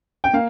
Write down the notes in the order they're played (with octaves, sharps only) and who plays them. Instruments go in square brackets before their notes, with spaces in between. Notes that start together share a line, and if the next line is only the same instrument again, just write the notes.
[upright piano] G5
A#3 F5